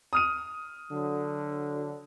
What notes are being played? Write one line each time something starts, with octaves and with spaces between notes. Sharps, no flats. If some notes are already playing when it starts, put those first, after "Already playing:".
D#6 F6 D#7
D3 F#3